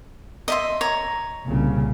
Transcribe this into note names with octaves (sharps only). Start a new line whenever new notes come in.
D#5 E5 C6
C#5 A#5
C2 A#2 C#3